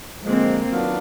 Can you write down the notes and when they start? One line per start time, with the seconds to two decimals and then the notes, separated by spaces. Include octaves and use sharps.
0.24 D3 F3 G#3 A#3 C4
0.70 D#3 F#3 B3 D4 F4